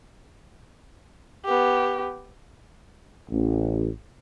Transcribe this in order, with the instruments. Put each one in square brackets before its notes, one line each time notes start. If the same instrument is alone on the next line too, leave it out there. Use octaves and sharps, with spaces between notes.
[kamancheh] B3 G4
[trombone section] A1